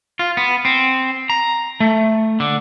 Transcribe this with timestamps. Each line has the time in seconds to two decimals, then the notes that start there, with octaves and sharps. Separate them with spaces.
0.19 F4
0.37 B3
0.65 C4
1.30 A#5
1.80 A3
2.40 D3